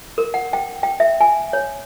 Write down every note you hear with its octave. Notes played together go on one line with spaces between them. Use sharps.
A#4
F#5
G5
G5
E5
G#5
C#5